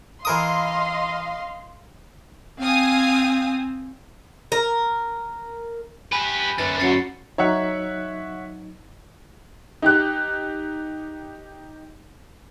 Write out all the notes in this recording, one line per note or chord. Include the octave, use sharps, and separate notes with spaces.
E3 A#4 D#5 F5 C6 D#6
C4 F5 G#5 D#6
A#4
G4 B4 G#5 B5
F#2 D3 B4 A6
F#3 C#4 A6 C7 C#7
F#3 D#4 C#5 E5 F#5
D#4 G4 F#6